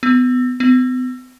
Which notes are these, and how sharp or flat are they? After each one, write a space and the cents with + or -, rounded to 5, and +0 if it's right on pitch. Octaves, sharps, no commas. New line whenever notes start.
B3 +25
B3 +45